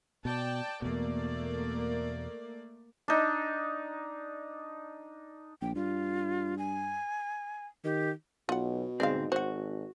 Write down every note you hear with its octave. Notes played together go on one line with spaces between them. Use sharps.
B2 D5 G5 A5
E2 B2 A3 A#3 D5
D4 D#4
A#1 G5
G2 F4
G#5
D#3 G4
B1 B2 F4 F#5
D2 G#2 G#3 C4 D5 F5
G#1 F#4 C5 F#5